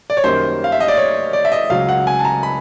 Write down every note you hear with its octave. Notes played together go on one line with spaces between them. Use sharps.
D5
C#5
F#2 D#3 G3 A#3 C5
F5
E5
D#5
D5
C#5
D5
E5
D#5
C#2 C#3 F#3 F5
F#5
G#5
A5
A#5
B5